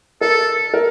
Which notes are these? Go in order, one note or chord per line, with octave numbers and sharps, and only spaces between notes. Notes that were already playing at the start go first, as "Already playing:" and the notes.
A4 A#4
A#4